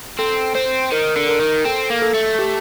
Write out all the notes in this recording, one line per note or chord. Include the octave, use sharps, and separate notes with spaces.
C4 A4
C4 C5
D#3 A#4
D3
A#4
D#3
C4 A4
A#3
A4
A3
G4